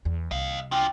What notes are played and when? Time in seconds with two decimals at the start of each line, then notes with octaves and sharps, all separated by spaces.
0.05 E2
0.31 C2 D#5 F5
0.72 D4 F4 G5